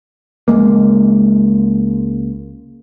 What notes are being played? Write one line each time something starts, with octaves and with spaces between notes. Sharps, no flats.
C#2 G#3 A#3